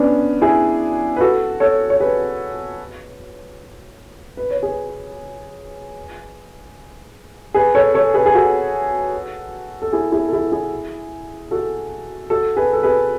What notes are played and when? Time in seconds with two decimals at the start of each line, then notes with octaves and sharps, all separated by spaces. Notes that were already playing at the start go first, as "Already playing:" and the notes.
Already playing: B3 C#4 D4
0.41 E4 G#4
1.16 B4
1.20 F#4 A4
1.60 A4 C#5
1.90 C#5
2.00 G#4 B4
4.37 B4
4.51 C#5
4.63 G#4 B4
7.54 G#4 B4
7.75 A4 C#5
7.94 A4 C#5
8.14 G#4 B4
8.26 G#4
8.35 F#4 A4
9.82 A4
9.93 E4 G#4
10.12 E4 G#4
10.28 A4
10.32 E4 G#4
10.52 E4 G#4
11.51 F#4 A4
12.30 F#4 A4
12.56 G#4 B4
12.73 A4
12.83 G#4 B4